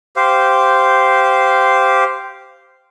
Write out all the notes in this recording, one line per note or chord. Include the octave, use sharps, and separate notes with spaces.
G4 C5 F5